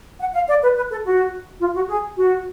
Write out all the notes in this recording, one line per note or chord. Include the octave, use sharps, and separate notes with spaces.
F#5
F5
D5
B4
B4
A4
F#4
F4
F#4
G#4
F#4